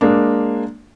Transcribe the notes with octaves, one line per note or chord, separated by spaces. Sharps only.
G#3 A#3 D4